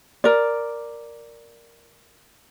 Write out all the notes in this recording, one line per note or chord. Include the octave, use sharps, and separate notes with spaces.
A#4 D5